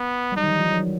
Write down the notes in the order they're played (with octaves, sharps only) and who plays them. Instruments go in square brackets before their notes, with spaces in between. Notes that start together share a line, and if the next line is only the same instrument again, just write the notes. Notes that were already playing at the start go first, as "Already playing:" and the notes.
Already playing: [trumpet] B3
[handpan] G3
[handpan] F#3 [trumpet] D#4
[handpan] D#3
E3
F3
F#3